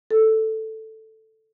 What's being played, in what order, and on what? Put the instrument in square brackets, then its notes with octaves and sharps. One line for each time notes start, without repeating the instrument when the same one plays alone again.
[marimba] A4